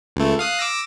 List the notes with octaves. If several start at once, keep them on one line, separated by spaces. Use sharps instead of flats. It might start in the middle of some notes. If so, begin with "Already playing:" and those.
C#2 A3
F5 D#6 F#6
D6 E6 A#6